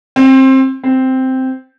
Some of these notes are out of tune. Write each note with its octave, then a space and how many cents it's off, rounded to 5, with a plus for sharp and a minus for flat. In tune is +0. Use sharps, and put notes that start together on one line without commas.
C4 +20
C4 -5